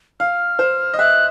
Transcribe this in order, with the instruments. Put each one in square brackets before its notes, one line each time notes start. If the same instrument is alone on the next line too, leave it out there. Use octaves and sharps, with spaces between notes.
[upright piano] F5 [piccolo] F6
[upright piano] C5
D#5
[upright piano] E5 [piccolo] F#6